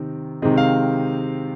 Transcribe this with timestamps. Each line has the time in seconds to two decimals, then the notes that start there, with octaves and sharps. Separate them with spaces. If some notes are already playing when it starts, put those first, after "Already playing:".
Already playing: C3 D#3 C4
0.42 C3 D#3 G#3 C4 D#5
0.57 F5